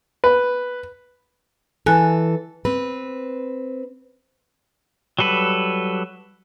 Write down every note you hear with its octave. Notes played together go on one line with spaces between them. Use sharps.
B4
E3 A4 G#5 F#6
C4 B4
F#3 G3 A4 B4